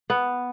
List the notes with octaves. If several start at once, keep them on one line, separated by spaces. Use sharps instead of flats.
B3